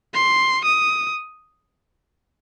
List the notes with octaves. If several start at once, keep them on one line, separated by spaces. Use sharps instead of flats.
C6
D#6